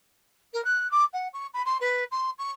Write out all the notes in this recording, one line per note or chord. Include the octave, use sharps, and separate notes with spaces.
A#4
F#6
D6
F#5
C#6
B5
C6
B4
C6
C#6